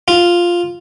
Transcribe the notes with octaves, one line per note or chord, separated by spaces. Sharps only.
F4